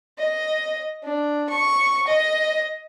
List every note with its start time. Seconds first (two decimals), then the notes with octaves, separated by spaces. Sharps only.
0.18 D#5
1.03 D4
1.49 C#6
2.07 D#5